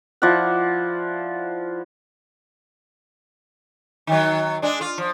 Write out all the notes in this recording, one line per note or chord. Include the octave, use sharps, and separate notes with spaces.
F3 E4 D5 F#5
D#3 F#3
G#3 D4
F4
F3